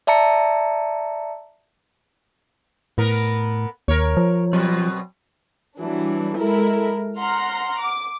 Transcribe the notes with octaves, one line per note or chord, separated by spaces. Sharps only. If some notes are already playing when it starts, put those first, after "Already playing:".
D5 E5 A5 A#5 C#7
A2 B3 A#4
D#2 A#4 C#5
F3
B2 F#3 C4
E3 F#3 G3 D4
G#3 E4 A4 A#4
F#5 A#5 C6 F6
D6